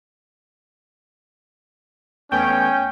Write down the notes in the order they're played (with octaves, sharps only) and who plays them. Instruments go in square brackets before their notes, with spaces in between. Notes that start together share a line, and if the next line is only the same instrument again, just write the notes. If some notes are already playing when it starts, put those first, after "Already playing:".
[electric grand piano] E2 A3 B3 [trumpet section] C#4 [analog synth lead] G5 [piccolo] G6